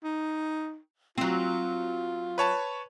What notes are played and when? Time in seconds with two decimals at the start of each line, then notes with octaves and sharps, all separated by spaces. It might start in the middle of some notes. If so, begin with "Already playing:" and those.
0.04 D#4
1.18 F#3 C4 F4
2.38 B4 C#5 A5